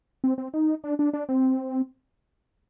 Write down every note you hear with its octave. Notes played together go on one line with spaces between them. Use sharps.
C4
C4
D#4
D4
D4
D4
C4